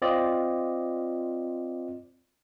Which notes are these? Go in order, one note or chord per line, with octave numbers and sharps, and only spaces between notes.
C4 F4 D5 D#5